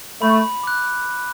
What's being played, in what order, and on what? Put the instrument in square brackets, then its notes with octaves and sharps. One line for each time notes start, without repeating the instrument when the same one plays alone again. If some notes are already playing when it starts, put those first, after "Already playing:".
[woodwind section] A3 [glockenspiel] B5
[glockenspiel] D6 F#6